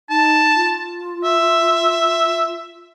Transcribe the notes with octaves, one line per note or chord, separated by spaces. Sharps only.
D#4 A5
F4
E5